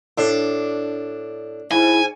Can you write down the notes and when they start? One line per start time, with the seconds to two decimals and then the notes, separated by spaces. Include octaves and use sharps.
0.18 A2 D4
1.71 G#2 E4 G#5